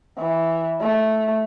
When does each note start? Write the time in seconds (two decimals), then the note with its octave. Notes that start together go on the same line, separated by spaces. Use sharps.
0.18 E3
0.81 A3